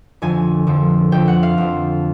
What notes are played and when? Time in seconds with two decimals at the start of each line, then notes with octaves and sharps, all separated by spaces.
0.22 F2 D3 F3 G#5
0.67 F2 D3 F3
1.12 F2 D3 F3 G5
1.28 F#5
1.43 F5
1.58 F2 D3 F3